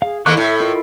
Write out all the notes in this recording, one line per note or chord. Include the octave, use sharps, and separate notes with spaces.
G#4 F5
D#2 A3 A#3 E4 C#6 D6 F#6
A2 E5
F4 A#4 D#5